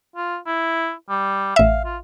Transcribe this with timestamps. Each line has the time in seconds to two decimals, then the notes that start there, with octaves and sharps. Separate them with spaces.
0.16 F4
0.47 E4
1.09 G3
1.56 A1 E5 F5
1.85 F4